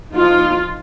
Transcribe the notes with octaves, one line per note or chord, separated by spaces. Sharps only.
F3 D#4 F4